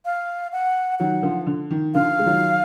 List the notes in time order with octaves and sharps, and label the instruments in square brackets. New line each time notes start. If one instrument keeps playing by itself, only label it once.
[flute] F5
F#5
[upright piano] D#3 F#3 [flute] F#5
[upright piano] D3 F3
D3
D#3
[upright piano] D3 F3 [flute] F5
[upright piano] G#3
D#3 F#3